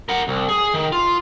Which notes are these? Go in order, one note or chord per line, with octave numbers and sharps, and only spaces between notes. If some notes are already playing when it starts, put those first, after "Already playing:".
A#4 F#5
C2
G#4
D#3
F4